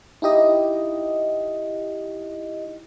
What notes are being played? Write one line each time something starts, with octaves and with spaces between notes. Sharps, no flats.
D#4 E4 G4 D#5